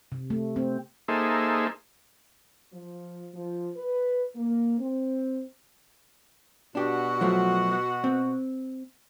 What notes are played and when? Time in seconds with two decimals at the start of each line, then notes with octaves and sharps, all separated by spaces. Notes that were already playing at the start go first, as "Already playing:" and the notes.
0.12 C3
0.30 A3
0.56 C4
1.08 A#3 D#4 G#4 A4 C5 E5
2.73 F3
3.34 F3
3.76 B4
4.35 A#3
4.78 C4
6.75 B2 D4 F#4 G4
7.21 F3 F#3 A3
8.04 C4